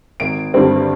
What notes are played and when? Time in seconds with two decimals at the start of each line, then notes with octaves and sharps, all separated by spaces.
0.20 G#1 D7
0.54 G2 D3 G3 C4